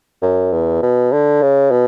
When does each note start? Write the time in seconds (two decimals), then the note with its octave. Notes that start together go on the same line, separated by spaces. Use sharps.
0.22 F#2
0.53 E2
0.82 B2
1.12 D3
1.42 C#3
1.71 B2